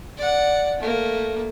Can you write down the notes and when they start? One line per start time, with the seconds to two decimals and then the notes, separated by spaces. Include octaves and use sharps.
0.17 D5 F#5
0.80 A3 A#3